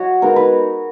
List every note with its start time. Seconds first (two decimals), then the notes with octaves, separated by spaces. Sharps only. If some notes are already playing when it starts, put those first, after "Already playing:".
Already playing: F#3 F#4 C#5 D#5
0.22 G#3 B3 D#4 A#4
0.36 B4